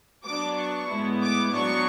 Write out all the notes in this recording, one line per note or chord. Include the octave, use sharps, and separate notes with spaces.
F#3 B3 D4 D6
C#6
A2 G#3 B3 E4
D6
F#3 B3 D4 C#6